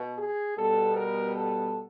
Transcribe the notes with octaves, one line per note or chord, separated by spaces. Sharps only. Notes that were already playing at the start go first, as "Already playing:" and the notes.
Already playing: B2
G#4
B2 G3 B3 A4
A#4
A4